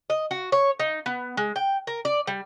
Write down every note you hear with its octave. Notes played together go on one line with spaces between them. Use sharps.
D#5
F#4
C#5
D#4
B3
G#3
G5
A#4
D5
G3